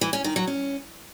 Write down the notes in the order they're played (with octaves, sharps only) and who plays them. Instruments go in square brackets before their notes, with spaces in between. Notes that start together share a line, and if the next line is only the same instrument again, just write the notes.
[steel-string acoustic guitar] E3
C#4
D#3
F#3
C#4